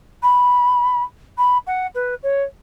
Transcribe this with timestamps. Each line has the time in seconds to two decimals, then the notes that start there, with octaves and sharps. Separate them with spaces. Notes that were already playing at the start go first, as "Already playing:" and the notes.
0.23 B5
1.38 B5
1.67 F#5
1.95 B4
2.23 C#5